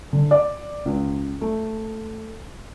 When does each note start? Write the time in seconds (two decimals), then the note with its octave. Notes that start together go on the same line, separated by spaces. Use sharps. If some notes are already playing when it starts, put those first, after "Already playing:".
0.13 D3
0.31 D5
0.86 C#2
1.41 A3